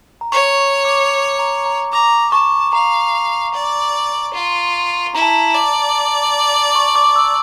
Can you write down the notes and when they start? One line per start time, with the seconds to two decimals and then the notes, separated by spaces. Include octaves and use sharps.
0.21 A#5
0.32 C#5 C#6
0.58 C#6
0.85 D6
1.39 A#5
1.66 A#5
1.93 A#5 D6
2.32 A5 C#6
2.73 F5 A#5
3.54 D5
4.34 F4
5.14 E4 A#5
5.22 A5
5.30 A#5
5.55 D5
6.75 C#6
6.96 D6
7.16 E6